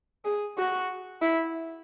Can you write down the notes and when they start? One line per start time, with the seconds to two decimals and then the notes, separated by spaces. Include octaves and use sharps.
0.25 G#4
0.58 F#4
1.22 E4